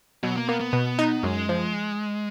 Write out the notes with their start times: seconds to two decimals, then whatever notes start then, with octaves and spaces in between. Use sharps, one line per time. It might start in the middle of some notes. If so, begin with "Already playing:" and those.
0.23 B2 F#3
0.35 A#3
0.48 A#3 B3
0.61 B3
0.73 B2
0.99 D#4
1.23 F#2 G#3
1.49 F3